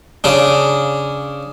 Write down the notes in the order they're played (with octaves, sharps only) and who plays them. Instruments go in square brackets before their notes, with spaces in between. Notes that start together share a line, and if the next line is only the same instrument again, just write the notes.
[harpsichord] C#3 D4